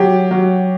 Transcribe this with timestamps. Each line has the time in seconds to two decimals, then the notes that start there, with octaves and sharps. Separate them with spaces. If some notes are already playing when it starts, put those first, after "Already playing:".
Already playing: F#3 G4
0.31 F#3